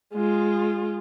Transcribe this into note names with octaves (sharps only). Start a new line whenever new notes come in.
G#3 F4